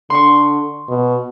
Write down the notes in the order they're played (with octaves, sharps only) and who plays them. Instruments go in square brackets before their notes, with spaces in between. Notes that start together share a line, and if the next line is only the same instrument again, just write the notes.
[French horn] D3 [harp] C6 C#6
[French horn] B2